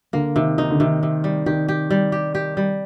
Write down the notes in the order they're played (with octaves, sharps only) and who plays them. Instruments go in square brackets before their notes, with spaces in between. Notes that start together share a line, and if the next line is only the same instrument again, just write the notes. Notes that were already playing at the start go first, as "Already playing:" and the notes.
[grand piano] D3 [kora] A#3
[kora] C3 [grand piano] D#3
[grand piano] D#3 [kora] D#4
[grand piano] D3
[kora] C3 [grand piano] D#3
[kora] C3
G3
[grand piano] D#3 [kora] G4
[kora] G4
G3
G4
G4
G3